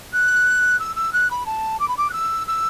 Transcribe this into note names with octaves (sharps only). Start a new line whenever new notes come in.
F#6
E6
E6
F#6
B5
A5
D6
B5
D6
F#6
E6
E6